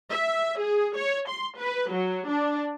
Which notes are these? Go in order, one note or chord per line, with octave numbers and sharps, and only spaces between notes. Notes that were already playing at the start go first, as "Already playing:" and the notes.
E5
G#4
C#5
C6
B4
F#3
D4